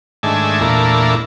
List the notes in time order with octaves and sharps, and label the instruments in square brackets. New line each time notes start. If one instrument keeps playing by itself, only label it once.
[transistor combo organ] G#2 D#3 A3 D4 E5 G#5
E2 A#2 A3 A#3 D4 E4